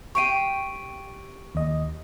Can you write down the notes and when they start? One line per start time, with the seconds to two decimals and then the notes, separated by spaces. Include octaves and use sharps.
0.15 G4 F5 G5 C#6 D7 D#7
1.55 D#2 D#5